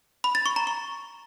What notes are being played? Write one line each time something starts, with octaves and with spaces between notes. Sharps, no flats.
B5
A6
C#6
A#5
C#6